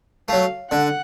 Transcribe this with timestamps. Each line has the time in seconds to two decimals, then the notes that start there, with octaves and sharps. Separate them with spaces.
0.28 F#3 A3 F5
0.71 D3 F#5